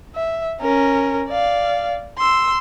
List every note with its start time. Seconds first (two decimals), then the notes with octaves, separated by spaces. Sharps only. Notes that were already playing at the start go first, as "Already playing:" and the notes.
0.15 E5
0.61 C#4 A#4
1.30 D5 F5
2.18 C6 E6